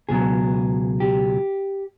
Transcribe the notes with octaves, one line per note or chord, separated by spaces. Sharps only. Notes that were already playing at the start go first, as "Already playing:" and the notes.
C#2 B2 F#3 G#4
G4